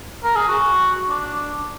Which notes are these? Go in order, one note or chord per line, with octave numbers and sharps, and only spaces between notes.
A#4
G#4
F#4
D4